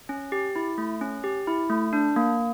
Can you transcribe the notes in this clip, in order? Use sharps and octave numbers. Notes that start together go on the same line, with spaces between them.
C#4
G4
E4
A3
C#4
G4
E4
A3
D4
A#3